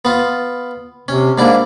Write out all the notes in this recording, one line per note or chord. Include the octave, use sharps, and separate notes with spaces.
B3 F4
C3 C#4
G#2 A#3 D4 E4